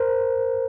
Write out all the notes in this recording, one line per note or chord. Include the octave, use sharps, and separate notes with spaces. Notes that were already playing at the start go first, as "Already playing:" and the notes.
Already playing: A#4 C5